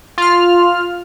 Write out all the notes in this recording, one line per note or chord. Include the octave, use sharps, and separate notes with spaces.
F4 F6